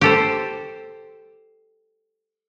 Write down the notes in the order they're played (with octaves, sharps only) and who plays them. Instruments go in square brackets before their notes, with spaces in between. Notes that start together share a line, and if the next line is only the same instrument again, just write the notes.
[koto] G4 A4 C5